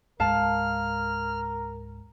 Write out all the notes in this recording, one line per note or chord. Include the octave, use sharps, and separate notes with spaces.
C#2 G#2 G#3 A#4 F5 A5 F6